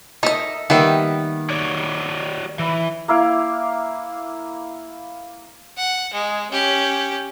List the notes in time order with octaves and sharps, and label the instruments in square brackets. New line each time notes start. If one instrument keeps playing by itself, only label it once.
[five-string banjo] D#4 D#5 [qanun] A4 A#4 E5
[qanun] D#3 G3 A#3 [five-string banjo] B3 E5
[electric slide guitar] F#4 C#5 D5
E3
[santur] A#3 E4 F5 D6
[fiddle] F#5
G#3
C#4 G4